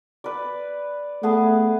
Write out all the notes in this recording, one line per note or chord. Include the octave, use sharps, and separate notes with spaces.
B4 D5
A3 B3 G#4 A5